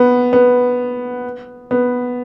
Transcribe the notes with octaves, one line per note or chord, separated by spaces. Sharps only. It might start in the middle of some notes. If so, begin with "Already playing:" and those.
Already playing: B3
B3
B3